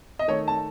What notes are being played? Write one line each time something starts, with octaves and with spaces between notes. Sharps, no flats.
D#5
D#3 A3 C#5
A5